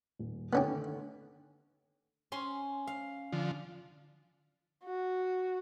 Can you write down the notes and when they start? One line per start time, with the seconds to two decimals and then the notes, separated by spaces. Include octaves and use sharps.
0.19 D#1
0.53 D3 D#3 A3 B3 C#4 G4
2.32 C#4 C6
2.87 F5
3.32 D3 F3
4.85 F#4